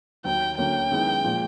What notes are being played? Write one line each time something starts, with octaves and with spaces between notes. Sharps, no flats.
D#2 D#3 F#3 G5
D2 D3 F#3 A#3 C#4 G5
F#2 D#3 G#3 B3 E4
A#2 F3 G#3